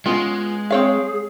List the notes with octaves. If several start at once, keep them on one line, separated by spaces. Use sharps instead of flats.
G#3 B3 C#4 F4
C4 G#4 C#5 F5